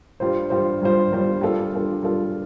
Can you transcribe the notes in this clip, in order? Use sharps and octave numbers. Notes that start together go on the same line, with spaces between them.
G2 G3 F4 C5
G2 G3 F4 C5
G2 G3 F4 C5
G2 G3 F4 C5
G3 D4 F4 A4
G3 D4 F4 A4
G3 D4 F4 A4